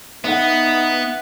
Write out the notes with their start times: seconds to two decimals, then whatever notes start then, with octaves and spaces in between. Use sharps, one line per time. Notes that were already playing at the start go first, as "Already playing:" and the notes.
0.24 B3 D#4 E5 F#5